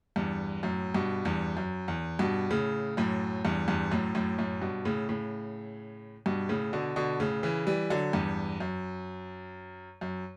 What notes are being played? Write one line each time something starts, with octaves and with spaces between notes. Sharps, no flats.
E2 G2
F#2 A2
G2 B2
E2 G2
F#2
E2
G2 B2
A2 C#3
F#2 A2
E2 G2
E2 G2
F#2 A2
F#2 A2
F#2 A2
G2 B2
A2 C#3
A2 C#3
G2 B2
A2 C#3
B2 D3
B2 D3
A2 C#3
C#3 E3
E3 G3
D3 F#3
E2 G2
F#2
F#2